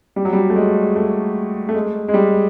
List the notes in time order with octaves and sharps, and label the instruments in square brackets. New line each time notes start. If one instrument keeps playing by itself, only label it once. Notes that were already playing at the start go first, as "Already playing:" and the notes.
[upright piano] G3
F#3
G3
A3
G#3
A3
A3
G#3
G#3
G3